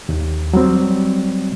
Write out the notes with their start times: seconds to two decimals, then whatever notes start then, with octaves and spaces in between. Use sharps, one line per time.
0.09 D#2
0.53 F#3 G3 C4